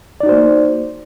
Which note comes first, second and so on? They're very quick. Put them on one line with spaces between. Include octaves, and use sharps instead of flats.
D5 D#4 F#4 C5 A#3